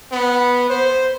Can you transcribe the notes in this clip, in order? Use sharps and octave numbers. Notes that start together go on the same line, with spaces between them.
B3
C5